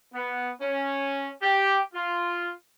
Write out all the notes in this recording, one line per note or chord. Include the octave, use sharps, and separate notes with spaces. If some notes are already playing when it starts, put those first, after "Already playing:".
B3
C#4
G4
F4